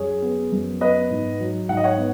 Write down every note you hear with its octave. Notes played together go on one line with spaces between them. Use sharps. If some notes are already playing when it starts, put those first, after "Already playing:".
Already playing: F#2 F#3 G#4 C#5
B3
F#2
B3 B4 D#5
G#2
F#3
G#2 F#5
D#5
C#5 F#5
B3